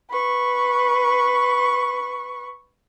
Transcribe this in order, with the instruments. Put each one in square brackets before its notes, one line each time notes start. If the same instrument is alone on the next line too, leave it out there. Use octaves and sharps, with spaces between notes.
[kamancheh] B4 C#6